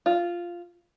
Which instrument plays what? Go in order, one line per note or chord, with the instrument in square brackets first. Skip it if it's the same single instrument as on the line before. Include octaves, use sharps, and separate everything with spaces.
[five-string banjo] F4